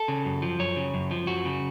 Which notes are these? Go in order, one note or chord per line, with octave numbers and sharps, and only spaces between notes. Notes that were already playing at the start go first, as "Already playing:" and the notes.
Already playing: A4
C#3
F#2
F3
F#2 C#5
C#3
F#2
F3
F#2 F#4
C#3